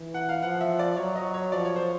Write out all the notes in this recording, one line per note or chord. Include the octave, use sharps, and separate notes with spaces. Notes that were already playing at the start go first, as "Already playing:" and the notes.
Already playing: E3
F#5
F5
F3 F#5
E5
D5
F#3 C#5
D#5
C#5
F3 D5
C#5
C5